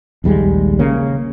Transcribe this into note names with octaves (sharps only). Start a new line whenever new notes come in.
A#1 D#2 G3 G#3
C#3 A#3